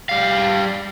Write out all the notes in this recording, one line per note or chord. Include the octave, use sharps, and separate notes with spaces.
G3 F5